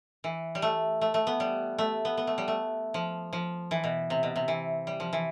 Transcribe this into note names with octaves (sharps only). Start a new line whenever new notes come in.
E3
G3
A3
A3
A3
B3
G3
A3
B3
B3
A3
G3
A3
F3
F3
E3
B2
C3
B2
C3
E3
G3
F3
E3